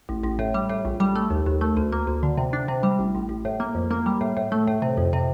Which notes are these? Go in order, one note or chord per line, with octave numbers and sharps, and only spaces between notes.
A1
A1
A2
G3
A2
A#1
G3
A3
D#2
D#2
A3
D2
A#3
D2
D3
C3
D4
C3
G3
A1
A1
A1
A2
A#3
F2
A#3
G3
A2
A2
A3
A2
C3
F2
C3